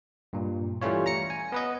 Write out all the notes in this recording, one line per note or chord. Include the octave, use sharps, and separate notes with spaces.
G2 A#2
E3 G3 A3 C#4 F4 C#5
A#5 A#6 C#7
G#5
B3 B4 D#5